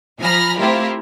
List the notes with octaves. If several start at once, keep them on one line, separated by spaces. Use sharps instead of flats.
F3 G#5 A#5 B5 F6 A#6
A3 C4 E4 F4 G4 A#4